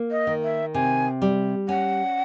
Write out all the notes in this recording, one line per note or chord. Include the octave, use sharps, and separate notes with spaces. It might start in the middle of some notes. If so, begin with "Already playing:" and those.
Already playing: A#3
D#5
D#3
E5
C3 G#5
G3
C#4 F#5